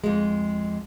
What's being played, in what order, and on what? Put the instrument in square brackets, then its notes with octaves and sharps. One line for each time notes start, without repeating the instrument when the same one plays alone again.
[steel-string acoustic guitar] F2 G#3